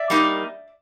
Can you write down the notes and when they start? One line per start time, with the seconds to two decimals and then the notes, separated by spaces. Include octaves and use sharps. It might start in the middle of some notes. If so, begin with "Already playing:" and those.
Already playing: D5 E5
0.10 G3 A#3 D#4